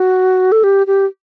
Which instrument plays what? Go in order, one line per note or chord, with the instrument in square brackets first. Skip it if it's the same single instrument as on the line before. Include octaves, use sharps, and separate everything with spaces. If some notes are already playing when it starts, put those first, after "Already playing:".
Already playing: [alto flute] F#4
A4
G4
G4